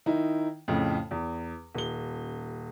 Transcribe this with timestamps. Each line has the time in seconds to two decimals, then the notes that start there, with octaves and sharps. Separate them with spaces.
0.06 D#3 D#4 E4
0.68 F2 A2 C#3
1.11 E2
1.75 D#1 G7